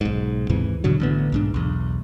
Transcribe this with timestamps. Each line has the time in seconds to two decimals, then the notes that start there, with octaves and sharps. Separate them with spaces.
0.01 B1 G#2
0.49 D#2 G#2 C3 E3
0.84 G2 B2 D3 F#3
1.00 A1 D3 B3
1.32 B1 G#2 D4
1.54 B1 E2